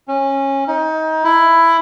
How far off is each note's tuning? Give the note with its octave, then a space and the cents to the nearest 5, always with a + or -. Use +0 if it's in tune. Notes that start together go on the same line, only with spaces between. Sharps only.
C#4 -20
D#4 +25
E4 +10